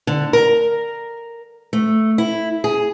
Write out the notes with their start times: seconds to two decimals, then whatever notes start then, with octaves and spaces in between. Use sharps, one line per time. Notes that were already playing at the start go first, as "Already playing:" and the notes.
0.07 D3
0.33 A#4
1.73 A3
2.18 E4
2.64 G#4